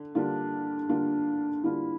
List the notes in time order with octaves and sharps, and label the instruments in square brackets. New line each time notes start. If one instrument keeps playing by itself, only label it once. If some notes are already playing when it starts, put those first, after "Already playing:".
Already playing: [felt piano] D3
[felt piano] D3 G3 A#3 F4 [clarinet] D4
[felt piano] D3 G3 A#3 F4
[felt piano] D3 G3 A#3 F4 [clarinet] E4